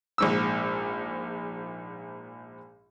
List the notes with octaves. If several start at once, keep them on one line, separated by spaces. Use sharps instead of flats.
A#1 G#2 E6